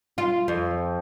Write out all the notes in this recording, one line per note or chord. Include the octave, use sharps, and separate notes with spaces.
F4
F2